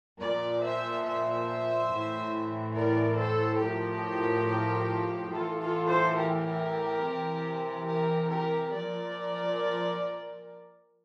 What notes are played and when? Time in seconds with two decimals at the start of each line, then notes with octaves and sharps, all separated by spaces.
0.19 A#2 F3 A#4 D5
0.62 C5 E5
1.04 C5 E5
1.91 A2 E3
2.75 A#4 D5
3.18 A4 C5
3.61 A2 F3 G4 A#4
5.31 A2 E3 F4 A4
5.60 F4 A4
5.88 A4 C5
6.17 G4 A#4
7.03 C3 E3
7.88 G4 A#4
8.31 G4 A#4
8.73 A#2 F3 A#4 D5